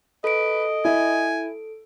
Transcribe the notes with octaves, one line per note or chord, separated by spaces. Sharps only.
A4 B4 D#5 D7
E4 G#5